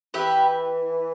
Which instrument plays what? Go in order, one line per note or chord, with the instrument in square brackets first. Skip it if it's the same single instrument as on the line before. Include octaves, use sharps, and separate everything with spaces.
[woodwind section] E3 [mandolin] G4 B4 E5